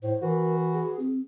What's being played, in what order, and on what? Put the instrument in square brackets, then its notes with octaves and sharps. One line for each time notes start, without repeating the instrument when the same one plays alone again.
[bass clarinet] A2 [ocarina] C5
[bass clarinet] E3 [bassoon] F#4 [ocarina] A#4
[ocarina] G#4
C4